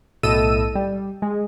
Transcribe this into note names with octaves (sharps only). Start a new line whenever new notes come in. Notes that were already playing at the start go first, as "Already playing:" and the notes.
B1 A2 A4 D#5 E6 D#7
G3
G#3